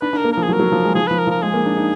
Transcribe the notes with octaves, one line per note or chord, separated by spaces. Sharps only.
D4 B4
D4
A#4
A#3
F3 A#4
G#4
F#3
A#4
F#3
F3
G#3
F3 G#4
F3 B4
A#4
F3
A#4
G#3 G#4
A#3
D4
D#4